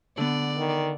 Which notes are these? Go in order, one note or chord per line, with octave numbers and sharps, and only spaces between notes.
D3 B3 D5
D#3